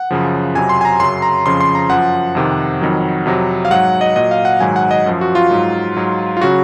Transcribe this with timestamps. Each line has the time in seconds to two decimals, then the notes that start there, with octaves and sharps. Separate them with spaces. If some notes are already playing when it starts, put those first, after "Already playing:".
Already playing: F#5
0.11 F#2 C#3 F3
0.55 F2 C3 F#3 G#5
0.69 C6
0.81 G#5
0.85 A#5
1.00 F#2 C#3 F#3 C6
1.22 A#5
1.45 F2 C#3 F3 C6
1.61 C6
1.75 A#5
1.90 F#2 F3 F#5
2.35 F2 C3 D#3
2.81 F2 D#3 F#3
3.25 F2 C3 F#3
3.65 F5
3.70 G#2 F#3 F#5
4.01 D#5
4.16 A#2 F#3 D#5
4.31 F5
4.45 F#5
4.60 G#2 D#3 F#3 G#5
4.76 F#5
4.91 D#5
5.06 F#2 F3
5.21 F#4
5.35 F4
5.51 G#2 F#3
5.96 G#2 F#3
6.37 F4
6.41 C#3 F#3 F#4